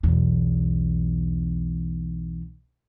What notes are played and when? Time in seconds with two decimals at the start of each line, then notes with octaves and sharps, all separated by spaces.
0.03 B1 E2